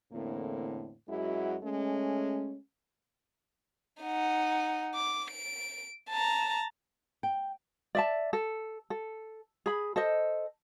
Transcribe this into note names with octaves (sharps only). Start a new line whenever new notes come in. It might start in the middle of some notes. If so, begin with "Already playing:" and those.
E2 A2 D3 A#3 C4
F#2 G#3 E4 F#4
G#3 A3 C#4
D#4 F#5
D6
D7
A5 A#5
G5
D5 E5 A5
A4
A4
G#4 B5
A4 C5 D#5